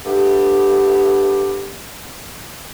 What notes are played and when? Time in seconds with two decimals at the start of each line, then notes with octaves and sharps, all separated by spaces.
0.05 A3 B3 D4 G4